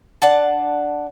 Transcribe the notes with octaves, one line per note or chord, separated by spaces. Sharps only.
D4 F#5 A5